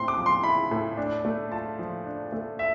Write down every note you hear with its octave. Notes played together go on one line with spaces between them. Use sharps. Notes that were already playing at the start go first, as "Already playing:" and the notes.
Already playing: A2 C4 E4 C6
D6
F3
C6
E4 B5
A2
D4
A3
F4 A5
F3
D4
A3
E5